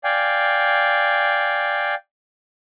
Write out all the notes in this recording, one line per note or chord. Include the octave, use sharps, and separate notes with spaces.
D5 F5 G5 G#5